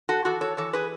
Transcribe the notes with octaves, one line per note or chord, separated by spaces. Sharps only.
F#4 A4
E3 F#4 A4
A4 C#5
E3 A4 C#5
G#4 B4